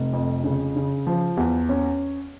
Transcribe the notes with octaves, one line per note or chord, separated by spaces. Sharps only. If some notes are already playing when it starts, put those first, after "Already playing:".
Already playing: F1
F2
C#3
C#3
F3
E2
C#4